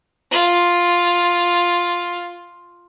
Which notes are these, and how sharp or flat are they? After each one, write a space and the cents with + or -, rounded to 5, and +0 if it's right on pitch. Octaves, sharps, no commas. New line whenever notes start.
F4 +5